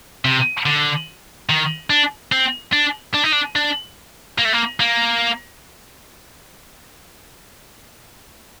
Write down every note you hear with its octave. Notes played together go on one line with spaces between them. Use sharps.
C3
D3
D#3
D4
C4
D4
D4
D#4
D4
D4
A#3
A3
A#3
A#3